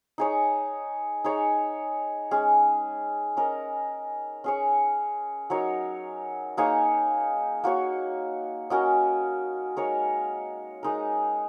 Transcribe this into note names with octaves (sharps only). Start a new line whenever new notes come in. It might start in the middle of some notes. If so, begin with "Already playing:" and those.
D#4 G#4 C#5
D#4 G#4 C#5
G#3 C#4 G#4
C#4 A#4 D#5
C#4 G#4 C#5
F#3 D#4 A#4 C#5
A#3 D#4 G#4 C#5
A#3 F#4 C#5
C#4 F#4 A#4 D#5
G#3 D#4 A#4 C#5
G#3 D#4 A#4